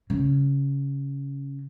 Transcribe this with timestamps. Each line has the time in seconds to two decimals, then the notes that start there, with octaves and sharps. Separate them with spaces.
0.10 C#3